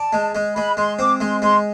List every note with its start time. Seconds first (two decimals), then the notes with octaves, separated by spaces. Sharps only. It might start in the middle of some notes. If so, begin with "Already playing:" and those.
Already playing: D5 A5
0.13 G#3
0.35 G#3
0.56 G#3 B5
0.77 G#3 C6
0.98 C4 D6
1.20 G#3 C6
1.41 G#3 C6